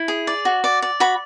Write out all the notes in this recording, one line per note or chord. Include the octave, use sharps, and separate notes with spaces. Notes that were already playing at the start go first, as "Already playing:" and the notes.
Already playing: E4
G#4
D5
F#4
D5
D5
F#4 B5